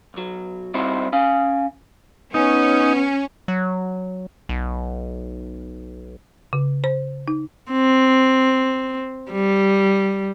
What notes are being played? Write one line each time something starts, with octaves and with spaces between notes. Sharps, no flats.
B1 F#3
G3 C4 D#4 E4 F#4 C5
C#4 F5 G#5
B3 C#4 D#4
F#3
B1
C#3
C5
D#4
C4
G3